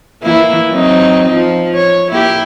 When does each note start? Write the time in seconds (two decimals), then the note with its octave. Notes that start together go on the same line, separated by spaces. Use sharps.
0.22 E3 A#3 E4
0.70 F#3 C4 D#4
1.30 F3
1.74 C#5
2.10 A#3 E4 G4